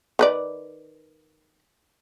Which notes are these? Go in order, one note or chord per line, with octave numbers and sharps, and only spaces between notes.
D#3 B4 D5